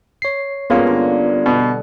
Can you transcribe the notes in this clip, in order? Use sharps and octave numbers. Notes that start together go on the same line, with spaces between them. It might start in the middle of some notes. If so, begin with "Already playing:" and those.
C#5 C7
G2 G#3 A#3 B3 C#4 F4
D3
B2